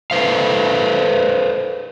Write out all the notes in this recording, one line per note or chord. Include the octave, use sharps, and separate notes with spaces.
A4 B4 C5 F5